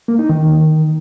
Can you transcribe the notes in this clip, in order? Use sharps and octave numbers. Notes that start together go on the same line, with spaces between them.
A#3
D#4
D#3